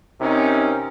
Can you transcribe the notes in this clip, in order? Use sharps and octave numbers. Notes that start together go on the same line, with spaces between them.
C3 C4 C#4 D#4 A#4